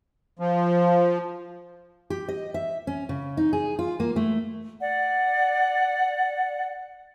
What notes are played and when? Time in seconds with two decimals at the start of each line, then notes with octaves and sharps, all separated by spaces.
0.39 F3
2.10 G4
2.28 D#5
2.54 E5
2.87 C#4
3.09 C#3
3.37 D#4
3.53 G#4
3.79 F4
4.00 A#3
4.16 A3
4.81 D5 F#5